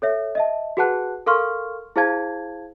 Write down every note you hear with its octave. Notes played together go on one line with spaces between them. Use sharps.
A4 C#5 E5
D#5 E5 A5
F#4 G#4 B4 F#5 A5 F#6
A4 A#4 F5 C6 C#6 F6
E4 G#4 C5 F5 A5 G#6